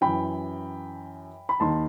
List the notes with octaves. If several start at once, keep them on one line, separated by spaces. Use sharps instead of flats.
F#2 E3 G5 B5
B5
D#2 D#3 A5 C6